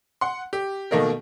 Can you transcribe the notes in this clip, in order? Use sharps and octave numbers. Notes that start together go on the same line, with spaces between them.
F#5 C6
G4
B2 D#3 A3 A#3 D#4 A#4